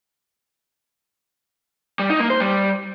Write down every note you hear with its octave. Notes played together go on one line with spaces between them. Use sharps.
G3
D#4
A#3
C5
G3